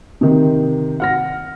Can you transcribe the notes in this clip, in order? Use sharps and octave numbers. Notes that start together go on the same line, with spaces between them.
C3 D#3 C4
F#5 F6 A#6